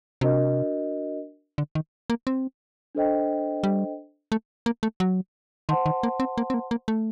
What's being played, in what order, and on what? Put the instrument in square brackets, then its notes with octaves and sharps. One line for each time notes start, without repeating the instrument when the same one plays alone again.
[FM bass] C3 [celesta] D4 F#4 A#4 D#5
[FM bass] D3
D#3
A#3
C4
[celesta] D4 A4 C5 D#5 G5
[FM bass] G3
A3
A#3
A3
F#3
[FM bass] D#3 [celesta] C5 F#5 A5 C6
[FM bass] D#3
A#3
C4
A#3
C4
A#3
A#3
A3